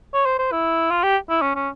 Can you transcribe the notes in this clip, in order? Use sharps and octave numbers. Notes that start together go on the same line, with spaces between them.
C#5
C5
C5
E4
F4
G4
E4
C#4
C#4